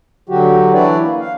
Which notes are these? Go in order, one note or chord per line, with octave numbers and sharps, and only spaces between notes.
D3 F#3 F#4 G4
E3 D4 E4 B4 C#5 D5
A#3
F5